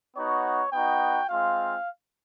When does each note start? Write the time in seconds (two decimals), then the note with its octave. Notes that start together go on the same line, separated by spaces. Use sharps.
0.16 B3 D#4 F#4 C#5
0.73 B3 D#4 F#4 G5
1.29 G#3 C4 F4 F5